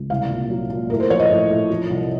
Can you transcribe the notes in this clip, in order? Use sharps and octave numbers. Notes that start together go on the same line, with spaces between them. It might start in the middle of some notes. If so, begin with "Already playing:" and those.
Already playing: C#2
C2 F5
A#2
F#3
A#2
A2 A#4
C5
F3 C#5
D#5
A2
A2
F3
C2